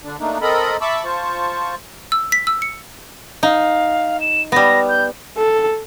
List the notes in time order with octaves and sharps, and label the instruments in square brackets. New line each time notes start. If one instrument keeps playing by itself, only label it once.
[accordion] D3 D4
A3 A#3 D4 D#4
C4 A4 A#4 D#5 B5
E5 A5 B5 C#6 D6 E6
F4 C5 A5 C#6
[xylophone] E6
B6
E6
C#7
[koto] D#4 [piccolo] F5
[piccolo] E7
[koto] G3 B3 [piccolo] A#6
[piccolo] G6
[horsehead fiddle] A4